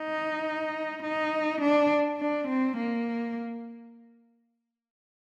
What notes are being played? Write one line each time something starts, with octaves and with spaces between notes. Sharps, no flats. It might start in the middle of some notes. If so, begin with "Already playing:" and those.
Already playing: D#4
D#4
D4
D4
C4
A#3